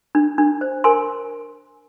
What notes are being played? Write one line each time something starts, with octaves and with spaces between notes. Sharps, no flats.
D4
D4
C5
A#4 G#5 C6